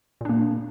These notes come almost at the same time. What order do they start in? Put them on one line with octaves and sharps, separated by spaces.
A#2 D4 A#3